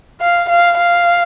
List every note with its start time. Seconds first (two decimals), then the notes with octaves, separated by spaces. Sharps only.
0.21 F5
0.49 F5
0.78 F5